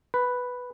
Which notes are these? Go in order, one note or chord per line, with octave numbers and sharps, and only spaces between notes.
B4